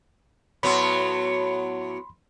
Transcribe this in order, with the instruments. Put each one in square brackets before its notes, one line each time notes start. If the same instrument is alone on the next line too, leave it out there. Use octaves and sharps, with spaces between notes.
[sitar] A2 F#3 B3 [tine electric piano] B5 C6